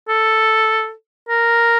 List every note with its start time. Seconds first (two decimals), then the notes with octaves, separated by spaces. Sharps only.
0.08 A4
1.29 A#4